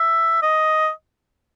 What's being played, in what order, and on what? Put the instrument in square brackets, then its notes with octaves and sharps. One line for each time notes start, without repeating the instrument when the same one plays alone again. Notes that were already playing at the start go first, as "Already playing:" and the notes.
Already playing: [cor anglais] E5
D#5